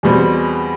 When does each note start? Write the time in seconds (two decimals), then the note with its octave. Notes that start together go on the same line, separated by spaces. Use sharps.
0.03 E2 B2 G3 C4